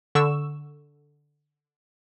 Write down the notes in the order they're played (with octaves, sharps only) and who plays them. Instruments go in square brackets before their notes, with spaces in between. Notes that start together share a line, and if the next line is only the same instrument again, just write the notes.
[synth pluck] D3 C#6 E6 E7